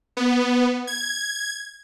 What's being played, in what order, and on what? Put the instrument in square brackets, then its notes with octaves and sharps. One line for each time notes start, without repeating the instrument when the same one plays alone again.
[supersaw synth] B3
G#6